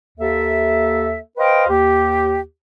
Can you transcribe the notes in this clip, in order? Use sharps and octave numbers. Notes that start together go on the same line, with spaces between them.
D#2 A#3 A4 E5
B4 C5 D#5 F5 G5
D#2 G4